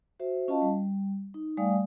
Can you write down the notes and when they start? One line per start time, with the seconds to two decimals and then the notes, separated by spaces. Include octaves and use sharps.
0.20 F#4 C5 E5
0.48 C#4 F4 D#5 F5 A5
0.62 G3
1.34 D#4
1.57 G3 A3 D5 F5 G#5 D#6